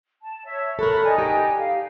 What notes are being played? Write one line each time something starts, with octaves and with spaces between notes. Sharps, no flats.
A5
C#5 E5
A4 A#4 B5 C#6 F#6
D#4 D5 G#5
G4
F5